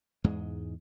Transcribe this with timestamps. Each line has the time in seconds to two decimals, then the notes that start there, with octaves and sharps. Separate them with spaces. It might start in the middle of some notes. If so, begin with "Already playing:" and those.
0.24 E2 G#2 G#3